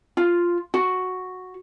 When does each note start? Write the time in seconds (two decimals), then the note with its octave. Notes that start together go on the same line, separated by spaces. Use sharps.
0.17 F4
0.74 F#4